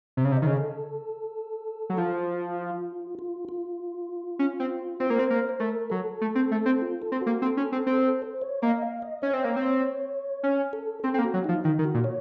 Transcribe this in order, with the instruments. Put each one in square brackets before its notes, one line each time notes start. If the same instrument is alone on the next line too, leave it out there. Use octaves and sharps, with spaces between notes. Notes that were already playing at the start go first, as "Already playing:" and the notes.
[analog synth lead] C3
C#3
C3
[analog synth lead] D#3 [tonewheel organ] D#5
[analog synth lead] C#3
[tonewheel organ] A4
[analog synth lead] F#3
[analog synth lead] F3 [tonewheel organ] F4
[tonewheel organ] F4
F4
[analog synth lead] C#4
C4
[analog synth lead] C4 [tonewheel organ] C5
[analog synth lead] A#3
C4
A#3
[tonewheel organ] C5
[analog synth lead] A3 [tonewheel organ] A#4
[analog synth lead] F#3 [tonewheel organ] A4
[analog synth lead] A3
C4
A3
C4
[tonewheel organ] F4
A4
[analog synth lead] C4
[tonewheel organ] F#4
[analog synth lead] A#3
[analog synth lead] C4 [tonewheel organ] A4
[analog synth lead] C#4
C4
C4
[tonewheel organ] A4
C5
C#5
[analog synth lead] A#3 [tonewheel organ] D#5
[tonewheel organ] F5
D#5
[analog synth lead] C#4 [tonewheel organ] C#5
[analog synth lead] C4 [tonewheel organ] D#5
[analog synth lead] A#3 [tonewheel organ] C#5
[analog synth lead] C4
C#4
[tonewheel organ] A4
[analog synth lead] C4 [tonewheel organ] A4
[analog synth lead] C4
A#3
[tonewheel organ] F#4
[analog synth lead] F#3
[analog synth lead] F3 [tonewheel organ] D#4
[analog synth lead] D#3 [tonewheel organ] D#4
[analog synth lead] D#3
[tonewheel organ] F#4
[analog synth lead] A#2
[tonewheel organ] C#5